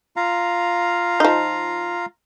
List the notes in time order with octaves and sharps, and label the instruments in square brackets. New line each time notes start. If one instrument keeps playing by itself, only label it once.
[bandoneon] F4 F5 A#5
[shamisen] F3 D#4